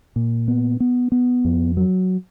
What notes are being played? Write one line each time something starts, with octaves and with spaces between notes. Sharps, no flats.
A#2
B3
B3
B3
F2
F#3